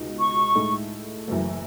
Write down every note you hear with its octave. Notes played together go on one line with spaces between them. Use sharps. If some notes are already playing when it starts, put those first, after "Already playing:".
Already playing: C#2 B2 G#3 D#4
C#6
A2 G#3 D#4 A4
F#1 F#2 E3 A3